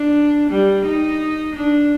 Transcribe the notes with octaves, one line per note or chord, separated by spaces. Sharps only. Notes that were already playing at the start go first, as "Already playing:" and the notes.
Already playing: D4
G3
D#4
D4